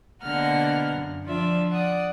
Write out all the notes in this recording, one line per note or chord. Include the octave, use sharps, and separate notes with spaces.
B2 D3 A#3 F#5 A#5 F6
F#2
F3 D4 F4 D5 E5
D5 F#5 D#6